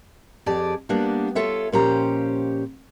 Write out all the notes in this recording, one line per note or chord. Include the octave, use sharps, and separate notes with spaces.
F2 G4 G#4 D5 A5
G3 A#3 B3 D4
F4 A4 C#5 E5
A#2 F3 C#4 G4 C5 A#5